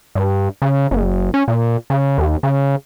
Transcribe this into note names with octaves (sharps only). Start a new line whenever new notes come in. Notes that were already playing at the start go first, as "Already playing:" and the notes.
G2
C#3
F#1
C#4
A#2
C#3
D#2
C#3